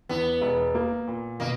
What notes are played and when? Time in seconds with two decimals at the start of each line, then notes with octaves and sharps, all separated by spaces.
0.09 E2 B3
0.41 E1
0.75 A#3
1.07 A#2
1.40 B2 A#3